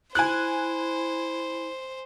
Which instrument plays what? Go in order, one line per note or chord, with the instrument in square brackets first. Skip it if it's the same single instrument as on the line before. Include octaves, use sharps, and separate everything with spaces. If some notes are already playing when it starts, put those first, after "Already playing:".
[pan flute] E4 [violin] C5 [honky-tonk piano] G#5 F#6